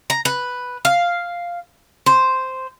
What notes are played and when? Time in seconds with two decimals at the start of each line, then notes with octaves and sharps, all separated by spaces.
0.10 A#5
0.25 B4
0.85 F5
2.06 C5